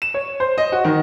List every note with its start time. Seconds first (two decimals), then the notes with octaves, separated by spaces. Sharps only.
0.02 E7
0.14 C#5
0.40 C5
0.58 D#5
0.72 F#4
0.84 D#3